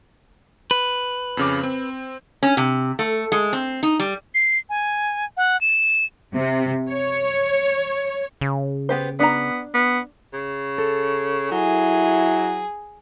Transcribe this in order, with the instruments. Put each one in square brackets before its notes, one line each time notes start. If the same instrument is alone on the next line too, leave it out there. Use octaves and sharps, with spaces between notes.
[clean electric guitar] B4
[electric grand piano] F2 C#3 D6
C4
[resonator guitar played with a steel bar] C#4
C3
A3
G#3
C4
D#4
G3
[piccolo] C7
G#5
F#5
E7
[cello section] C3
C#5
[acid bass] C#3
[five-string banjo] B3 G4 C5
[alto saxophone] B3 [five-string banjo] D4 A#5
[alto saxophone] B3
[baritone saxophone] C#3
[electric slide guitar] A4
[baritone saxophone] F#3 [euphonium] E4 [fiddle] G#4